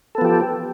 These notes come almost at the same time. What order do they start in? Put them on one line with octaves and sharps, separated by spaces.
A4 B3 F3 G4